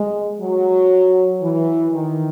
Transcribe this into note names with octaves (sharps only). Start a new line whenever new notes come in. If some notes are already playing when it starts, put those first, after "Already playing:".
Already playing: G#3
F#3
E3
D#3